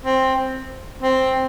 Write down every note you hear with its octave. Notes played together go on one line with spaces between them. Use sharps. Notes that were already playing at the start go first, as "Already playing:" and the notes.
C4
C4